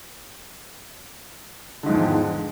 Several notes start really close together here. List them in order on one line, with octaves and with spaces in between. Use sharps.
D3 G#2 F3 E2 D#3